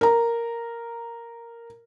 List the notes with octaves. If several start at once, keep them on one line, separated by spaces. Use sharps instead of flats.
A#4 A#5